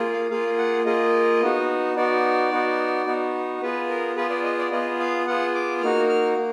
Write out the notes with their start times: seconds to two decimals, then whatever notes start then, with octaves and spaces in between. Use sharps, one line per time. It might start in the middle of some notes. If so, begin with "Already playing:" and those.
Already playing: A#3 F4 G#4
0.13 F5
0.30 A#3 F4 G#4 F5
0.58 F#5
0.85 A#3 F4 G#4 D#5
1.41 B3 D#4 F#4
1.96 B3 D#4 F#4 D5
2.52 B3 D#4 F#4
3.06 B3 D#4 F#4
3.61 B3 F4 G#4 B4
3.90 A#4
4.16 B3 F4 G#4 B4
4.30 D5
4.44 D#5
4.59 D5
4.71 B3 F4 G#4 D#5
5.00 F5
5.27 B3 F4 G#4 F#5
5.55 D6
5.82 A#3 D#4 F#4 F6
6.09 F6
6.37 A#3